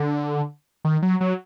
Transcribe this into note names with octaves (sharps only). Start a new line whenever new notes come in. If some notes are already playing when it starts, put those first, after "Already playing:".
Already playing: D3
D#3
F#3
F#3